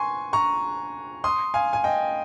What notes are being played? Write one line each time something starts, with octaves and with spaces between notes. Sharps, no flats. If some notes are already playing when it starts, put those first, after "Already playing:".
Already playing: G#5 C6 C#6
A#5 C#6
C6 D#6
F5 G#5
G#5
D#5 G5